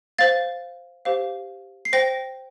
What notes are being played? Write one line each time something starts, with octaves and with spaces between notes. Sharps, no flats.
C5 F5 A6
G4 C5 F5
C7
C5 G5 A#6